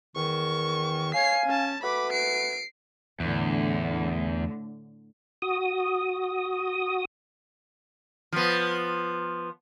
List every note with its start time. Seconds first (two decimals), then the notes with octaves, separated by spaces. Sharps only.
0.16 E2 D#3 C#6
1.14 C#5 F5 G#5 C7
1.46 C#4 A5
1.83 A3 F#4 B4 B5 D6
2.12 C7 D7
3.20 E2 A2 D3
5.42 F#4 D#6
8.32 F3 B3